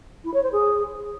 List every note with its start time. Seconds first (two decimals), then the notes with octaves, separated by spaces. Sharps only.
0.24 E4
0.33 C#5
0.43 C5
0.52 G#4